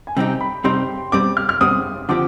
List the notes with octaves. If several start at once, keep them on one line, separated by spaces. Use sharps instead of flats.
G#5
C3 G3 C4 D#4 G4 G5
B5
C3 G3 C4 D#4 G4 C6
B2 G3 C4 D6
F6
F6
B2 G3 C4 D#6
D3 F3 C4 G4 D6